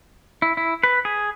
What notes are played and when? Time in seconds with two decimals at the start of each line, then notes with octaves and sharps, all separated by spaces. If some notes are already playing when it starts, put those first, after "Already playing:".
0.42 E4
0.57 E4
0.84 B4
1.05 G#4